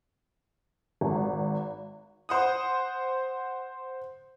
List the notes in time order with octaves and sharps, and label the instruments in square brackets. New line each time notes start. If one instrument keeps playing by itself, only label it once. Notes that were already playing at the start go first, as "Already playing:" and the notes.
[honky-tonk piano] G#1
C5 F#5 D#6